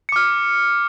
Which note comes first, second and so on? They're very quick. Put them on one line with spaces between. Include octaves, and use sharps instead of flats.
C#7 D6 F6